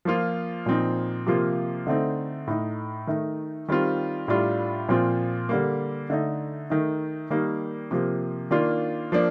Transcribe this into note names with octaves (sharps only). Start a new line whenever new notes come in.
F3 A#3 F4
A#2 F3 C4 D#4
C3 F3 A#3 F4
D3 A3 C4 D#4
A2 A3 D#4
D#3 A3 D#4
D#3 G3 C4 F4
A2 G3 D4 F4
A#2 F3 C4 F4
D3 G3 A#3
D3 A3 D#4
D#3 A3 D#4
D#3 G3 A#3 D#4
C3 F3 A#3
D#3 A#3 D4 F4
F3 A#3 D4